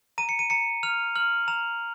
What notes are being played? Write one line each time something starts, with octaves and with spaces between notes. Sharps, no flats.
A#5 D#7
C#7
D#7
A#5 C#7
F6 F7
F6 F#7
A#5 F7